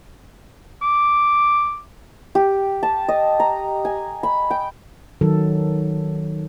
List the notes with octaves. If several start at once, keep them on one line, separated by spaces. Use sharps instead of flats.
D6
G4
A5
D#5
A#5
G#5
B5
G5
D#3 F#3 A4